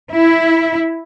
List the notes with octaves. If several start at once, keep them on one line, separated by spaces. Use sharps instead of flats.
E4